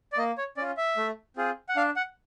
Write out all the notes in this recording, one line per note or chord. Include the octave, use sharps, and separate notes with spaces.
D5
A#3 D#5
C#5
C#4 F4 D5
E5
A3
C4 F4 G#4
F#5
D4 F5
F#5